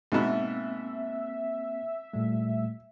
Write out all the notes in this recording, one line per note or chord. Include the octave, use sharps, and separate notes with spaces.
G#2 B2 A#3 C4 E5
A#2 G3 A3